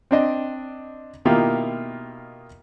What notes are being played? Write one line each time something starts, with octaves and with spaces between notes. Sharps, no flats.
C4 D4 D#5
B2 D#3 A#3 E4 F4 G4